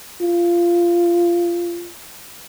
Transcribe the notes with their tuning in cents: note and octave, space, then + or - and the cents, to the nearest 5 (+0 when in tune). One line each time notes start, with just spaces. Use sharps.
F4 -15